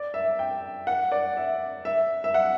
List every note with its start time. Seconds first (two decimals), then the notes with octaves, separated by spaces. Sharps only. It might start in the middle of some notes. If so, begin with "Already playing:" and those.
Already playing: D5
0.14 E5
0.39 G5
0.87 F#5
1.12 D5
1.37 E5
1.85 E5
2.24 E5
2.34 F#5